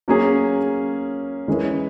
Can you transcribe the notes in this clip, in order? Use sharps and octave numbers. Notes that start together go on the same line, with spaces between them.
F#3 A#3 C#4 G#4
E3 G#3 C#4 E4 A#4